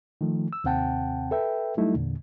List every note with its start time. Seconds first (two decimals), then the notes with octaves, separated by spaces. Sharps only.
0.21 D#3 F3 A3
0.53 E6
0.64 D#2 C3 C4 F#5 G5 A5
1.31 A4 B4 E5 G5
1.77 F#3 G3 A3 D#4 E4
1.94 E2 A#2 D3